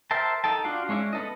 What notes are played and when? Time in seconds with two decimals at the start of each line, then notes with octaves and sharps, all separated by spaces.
0.11 A#4 C5 E5 G5 A5
0.44 D#4 A4 G5 A5
0.64 D4 F4 F#4 F5 G5
0.89 G#3 C#4 D4 E4
1.13 B3 A4 D#5